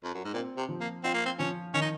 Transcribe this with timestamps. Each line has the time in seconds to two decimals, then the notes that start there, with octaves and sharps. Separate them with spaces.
0.04 F2
0.14 F#2
0.24 G#2
0.33 A#2 C4
0.57 C3
0.69 F3
0.80 A#3
1.03 C4 F4
1.14 A#3
1.25 C4
1.39 F3 C#4
1.74 D#3 C#4
1.81 D#4